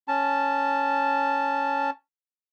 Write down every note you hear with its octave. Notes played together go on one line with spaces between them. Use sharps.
C#4 A5